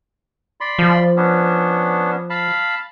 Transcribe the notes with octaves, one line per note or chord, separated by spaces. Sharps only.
D5 B5 C6
F3
B3 C#4 D4
F5 A5 B5